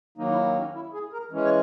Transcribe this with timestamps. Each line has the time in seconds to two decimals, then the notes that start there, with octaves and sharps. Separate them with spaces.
0.18 D#3 F#3 A#3 D#4
0.32 E4
0.46 D#4
0.60 C#4
0.75 E4
0.93 G#4
1.12 A#4
1.31 E3 G#3 C#4
1.45 C#5